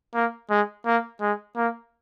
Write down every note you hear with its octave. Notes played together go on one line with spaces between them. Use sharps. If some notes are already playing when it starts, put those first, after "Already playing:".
A#3
G#3
A#3
G#3
A#3